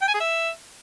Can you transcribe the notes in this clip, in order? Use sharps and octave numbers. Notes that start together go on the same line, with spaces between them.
G5
G#5
G#4
E5